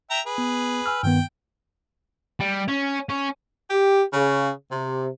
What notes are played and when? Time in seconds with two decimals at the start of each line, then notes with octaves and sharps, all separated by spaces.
0.10 E5 G5 A#5
0.26 G#4 B4
0.38 B3
0.86 G#5 E6 F6
1.03 G2 D#3 B3 G5
2.40 G3
2.68 C#4
3.09 C#4
3.70 G4
4.13 C#3
4.72 C3